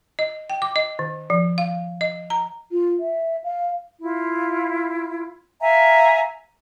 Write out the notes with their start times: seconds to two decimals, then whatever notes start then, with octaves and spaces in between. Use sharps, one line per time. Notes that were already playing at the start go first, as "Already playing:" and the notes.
0.19 D#5
0.50 G5
0.62 D6
0.76 D#5
0.99 D#3
1.30 F3
1.58 F5
2.01 D#5
2.30 A#5
2.72 F4
3.00 E5
3.44 F5
4.01 E4 F4
5.61 E5 F5 G#5 A#5